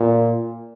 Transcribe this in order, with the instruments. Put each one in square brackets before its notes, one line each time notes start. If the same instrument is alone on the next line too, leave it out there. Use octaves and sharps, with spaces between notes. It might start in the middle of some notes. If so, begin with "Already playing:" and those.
Already playing: [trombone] A#2